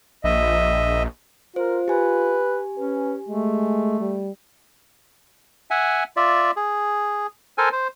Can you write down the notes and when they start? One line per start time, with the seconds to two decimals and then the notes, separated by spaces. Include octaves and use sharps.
0.24 A#1 D#5 E5
1.56 F4 A#4 C5
1.88 G4 B4 G#5
2.78 C#4 B4
3.29 G#3 A3
4.01 G3
5.71 E5 F#5 G#5
6.17 F4 D5 E5
6.56 G#4
7.58 A4 A#4 C5 G#5
7.72 C5